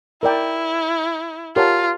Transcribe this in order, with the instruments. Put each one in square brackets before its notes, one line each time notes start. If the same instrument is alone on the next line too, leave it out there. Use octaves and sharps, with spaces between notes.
[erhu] E4 [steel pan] A#4 D5 G5
[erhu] F4 [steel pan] G4 A#4 C#5 F#5 A5